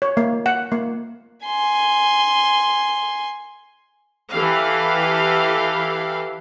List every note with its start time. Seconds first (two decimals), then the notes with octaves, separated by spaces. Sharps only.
0.02 C#5
0.17 A#3
0.46 F#5
0.72 A#3
1.45 G#5 C6
4.32 E3 G4 A4 F5